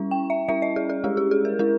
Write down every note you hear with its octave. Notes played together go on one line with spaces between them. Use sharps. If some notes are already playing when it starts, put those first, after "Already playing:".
Already playing: G3 C#4 E4
G5
E5
G3 C#4 E4 E5
D#5
G#4
G#4
G#3 C#4 E4 G4
G4
G#4
A#4
G#3 C#4 E4 A#4